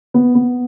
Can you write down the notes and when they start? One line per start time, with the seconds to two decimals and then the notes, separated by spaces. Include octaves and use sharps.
0.14 B3
0.35 B3